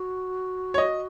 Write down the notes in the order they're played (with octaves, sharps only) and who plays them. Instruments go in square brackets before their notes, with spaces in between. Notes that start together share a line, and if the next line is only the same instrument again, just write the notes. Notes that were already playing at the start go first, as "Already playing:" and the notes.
Already playing: [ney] F#4
[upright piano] C#5
D#5